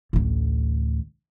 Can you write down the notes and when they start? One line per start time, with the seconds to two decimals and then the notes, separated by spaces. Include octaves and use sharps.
0.13 A1 D2